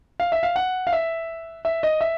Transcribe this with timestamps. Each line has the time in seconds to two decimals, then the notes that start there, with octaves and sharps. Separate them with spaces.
0.20 F5
0.32 E5
0.43 F5
0.56 F#5
0.87 F5
0.93 E5
1.65 E5
1.83 D#5
2.01 E5